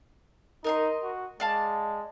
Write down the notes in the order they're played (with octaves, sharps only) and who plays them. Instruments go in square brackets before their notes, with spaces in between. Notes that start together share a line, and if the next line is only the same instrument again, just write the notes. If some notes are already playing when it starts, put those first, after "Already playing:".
[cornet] D#4 [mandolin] A#4 D#5 C6
[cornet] F#4
[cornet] G#3 [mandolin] D5 F5 A5